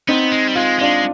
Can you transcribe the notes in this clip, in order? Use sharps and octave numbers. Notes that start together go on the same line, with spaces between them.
B3 C4 D#4
G#3
G3
G#3 F4
G#3 D4 F4